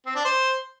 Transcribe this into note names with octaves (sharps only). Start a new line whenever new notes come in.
C4
D4
C5